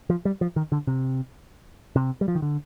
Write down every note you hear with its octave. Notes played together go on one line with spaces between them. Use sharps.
F3
G3
F3
D#3
D3
C3
C3
G3
F3
D#3
D3